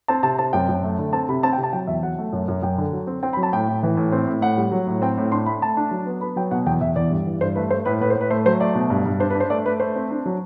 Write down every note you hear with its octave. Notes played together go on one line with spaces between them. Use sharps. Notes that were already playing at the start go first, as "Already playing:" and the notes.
C4 A5
C3 A5
C4 A5
F#2 G5
F#2
A3
D3
C4 A5
C3 B5
C4 A5
G5
C3
A5
F#3 G5
E2 E5
F#3 F#5
A3
F#2
F#2
F#2 G5
D3
F#3
C4
C4 G5
B5
F#3
A5
A2 G5
A2
E3
A2
C4
A2
A2 F#5
G3
F#3
A2
C4 G5
A2
D4 C6
A3 B5
A3 A5
D4
F#3
B3
B3 B5
F#3 G5
B2 F#5
E2 G5
E2 E5
E2 D5
G2
E3
G2 C5
A3 B4
A3 C5
A2 B4
A2 B4
C5
A2
B4
A3 C5
F#3 C5
A3 D5
B2
G2
G2
D4 C5
B4
D4
C5
A3 D5
A3 B4
A3 C5
C4
D4
F#3